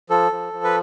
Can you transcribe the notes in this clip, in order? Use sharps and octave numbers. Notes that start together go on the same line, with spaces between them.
F3 A4
F3
F3
B4